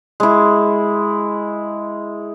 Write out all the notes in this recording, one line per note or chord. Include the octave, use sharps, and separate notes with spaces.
G#3 E4